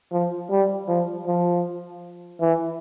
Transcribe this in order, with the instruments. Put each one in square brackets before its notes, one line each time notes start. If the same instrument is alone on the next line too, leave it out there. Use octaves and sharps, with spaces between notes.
[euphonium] F3
G3
F3
F3
E3